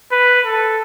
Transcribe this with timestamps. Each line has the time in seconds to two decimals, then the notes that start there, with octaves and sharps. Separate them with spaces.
0.12 B4
0.46 A4